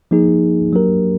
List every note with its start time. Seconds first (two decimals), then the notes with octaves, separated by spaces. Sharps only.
0.11 F3 A#3 D#4 G#4
0.73 F#3 A#3 D4 G4 A#4